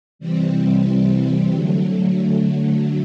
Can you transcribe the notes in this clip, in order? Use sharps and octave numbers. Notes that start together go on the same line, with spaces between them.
C3 E3 G3 C4
D3 F#3 A3